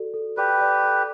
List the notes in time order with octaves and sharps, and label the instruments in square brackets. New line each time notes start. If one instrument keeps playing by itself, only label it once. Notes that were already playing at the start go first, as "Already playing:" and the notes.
Already playing: [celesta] F#4 A4 D5
A4
[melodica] G4 B4 [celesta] D5
[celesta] D5
A4